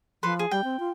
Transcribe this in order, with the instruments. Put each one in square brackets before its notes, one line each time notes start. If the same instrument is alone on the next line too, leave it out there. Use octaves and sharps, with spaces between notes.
[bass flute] F3 [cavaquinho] A4 B4 C6
[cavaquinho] G#4
[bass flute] G3 [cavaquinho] G5
[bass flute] C4
F4